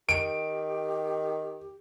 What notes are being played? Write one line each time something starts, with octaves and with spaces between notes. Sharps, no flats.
D#3 G4 D7